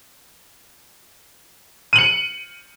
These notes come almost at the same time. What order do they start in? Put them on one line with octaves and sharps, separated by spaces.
D#7 F#7 C#7